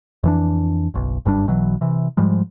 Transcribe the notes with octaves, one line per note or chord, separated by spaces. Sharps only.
F2 E3 D4
F#1 B1
F#1 G2 G3 D4
B1 B2 E3 F#3
C3 E3
G#2 F3 G3 G#3